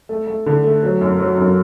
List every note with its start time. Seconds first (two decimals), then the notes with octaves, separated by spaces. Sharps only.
0.09 A3
0.27 A3
0.46 D3
0.64 A3
0.83 F#3
1.01 F#2
1.19 F#3
1.38 F#2